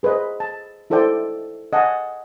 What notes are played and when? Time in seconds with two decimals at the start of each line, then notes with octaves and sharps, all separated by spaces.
0.03 G#4 B4 C5 D#5
0.40 A5
0.90 D#4 E4 A4 C5 D5 G5
1.73 D#5 F#5 G#5 A5 D#6